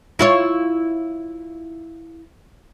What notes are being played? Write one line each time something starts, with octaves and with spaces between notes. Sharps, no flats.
E4 F4 C#5